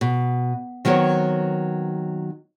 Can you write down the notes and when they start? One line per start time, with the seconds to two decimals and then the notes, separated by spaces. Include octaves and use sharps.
0.01 B2
0.85 D#3 F#3 B3 C4 C#5